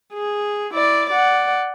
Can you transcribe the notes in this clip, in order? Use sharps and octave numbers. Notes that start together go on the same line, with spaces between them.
G#4
E4 D5
D5 F#5